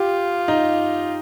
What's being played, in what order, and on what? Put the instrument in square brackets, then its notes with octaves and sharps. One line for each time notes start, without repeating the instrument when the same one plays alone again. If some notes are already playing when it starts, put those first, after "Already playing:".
Already playing: [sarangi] F4 [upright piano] G4
[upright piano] D#4